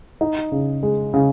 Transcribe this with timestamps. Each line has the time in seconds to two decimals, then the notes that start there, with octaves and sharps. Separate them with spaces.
0.21 D#4
0.52 C#3
0.83 G#3
1.14 C#3